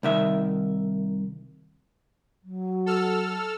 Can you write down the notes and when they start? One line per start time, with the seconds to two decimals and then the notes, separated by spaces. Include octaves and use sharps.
0.03 C2 D#3 E5
2.43 F#3
2.86 A4 E6 F6